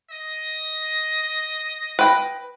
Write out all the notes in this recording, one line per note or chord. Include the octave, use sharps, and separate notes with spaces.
D#5
B4 G5